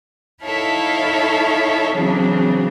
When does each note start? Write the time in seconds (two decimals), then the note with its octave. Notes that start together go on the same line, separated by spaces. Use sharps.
0.43 D#4 E4 A4 C#5 E5 F5
1.93 C#3 E3 F#3 C4 D4